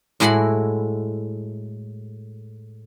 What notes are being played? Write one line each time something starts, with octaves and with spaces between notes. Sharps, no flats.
A2 G#3 E4 F#4 F#5 B5